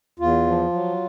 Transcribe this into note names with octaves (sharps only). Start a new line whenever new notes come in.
E2 F4
F3
F#3